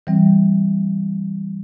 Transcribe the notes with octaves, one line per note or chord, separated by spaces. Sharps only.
E3 G3 C4